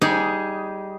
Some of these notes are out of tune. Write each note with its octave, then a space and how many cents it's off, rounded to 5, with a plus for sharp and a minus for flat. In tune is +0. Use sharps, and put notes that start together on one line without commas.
G3 -10 D#4 +10 G#4 +0